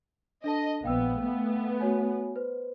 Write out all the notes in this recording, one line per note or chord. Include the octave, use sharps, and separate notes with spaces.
D4 A4 D#5 A5
A#1 B3 F5 G5 E6
A3 B3
F#4 C#5 G#5
B4 C5